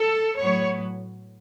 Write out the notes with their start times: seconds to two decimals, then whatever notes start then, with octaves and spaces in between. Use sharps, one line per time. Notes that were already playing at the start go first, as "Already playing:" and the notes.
Already playing: A4
0.38 A2 F#3 B3 C#5